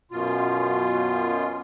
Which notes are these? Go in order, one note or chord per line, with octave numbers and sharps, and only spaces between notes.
F#2 B2 F4